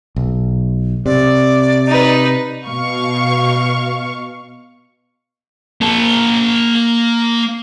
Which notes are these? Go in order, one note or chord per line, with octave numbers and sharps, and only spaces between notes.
B1
C3 D5
D#4 B4
B2 F5 C#6
A#3 A5